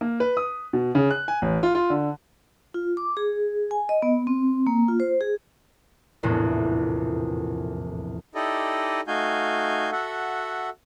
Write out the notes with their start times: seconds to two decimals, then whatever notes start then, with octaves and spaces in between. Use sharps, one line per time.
0.01 A#3
0.20 B4
0.37 D#6
0.73 B2
0.95 C#3
1.10 F#6
1.28 G#5
1.42 A1
1.63 F4
1.75 F4
1.90 D3
2.74 F4
2.97 D6
3.17 G#4
3.71 G#5
3.89 D#5
4.02 B3
4.27 C4
4.67 A#3
4.88 F4
5.00 C5
5.21 G#4
6.23 F1 A#1 E2 A2
8.35 D#4 E4 G4 A4 D5 D#5
9.08 A3 D#4 F#4 F5 G#5 G6
9.92 F#4 A4 E5 F#5